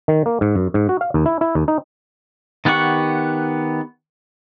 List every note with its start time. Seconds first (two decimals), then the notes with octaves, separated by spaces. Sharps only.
0.08 D#3
0.26 A#3
0.41 G#2
0.56 F#2
0.74 G#2
0.89 F#4
1.01 F5
1.14 D#2
1.26 E4
1.41 E4
1.55 D#2
1.68 D#4
2.65 D#3 B3 G4 F#5 C#6